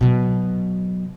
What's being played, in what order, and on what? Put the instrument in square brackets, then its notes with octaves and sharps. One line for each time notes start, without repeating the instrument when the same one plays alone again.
[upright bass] B2 F#3